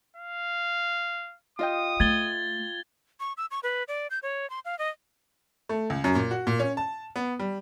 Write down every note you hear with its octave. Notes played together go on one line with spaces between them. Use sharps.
F5
F4 D#5 G5 D#6
A3 G#6 A6 G7
C#6
E6
C#6
B4
D5
G6
C#5
C6
F5
D#5
A3
C#2
F#2
A#2
F#4
A#2
C#4
A5
B3
G3